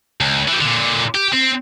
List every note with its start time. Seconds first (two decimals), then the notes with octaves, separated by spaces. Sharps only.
0.21 C#2
0.48 E3 G3
0.61 A#2 D3
1.15 G4
1.33 C4